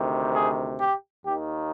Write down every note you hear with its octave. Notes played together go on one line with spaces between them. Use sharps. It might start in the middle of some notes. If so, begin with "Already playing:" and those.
Already playing: D2 C3 D#3
G#4
G4
D#2 D#3 A#3 G4